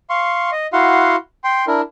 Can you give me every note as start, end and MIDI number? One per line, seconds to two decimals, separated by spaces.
0.10 0.50 77
0.10 0.50 84
0.10 0.50 85
0.52 0.67 75
0.73 1.16 64
0.73 1.16 66
0.73 1.16 77
0.73 1.16 78
0.73 1.16 84
1.44 1.65 79
1.44 1.65 84
1.67 1.81 62
1.67 1.81 64
1.67 1.81 70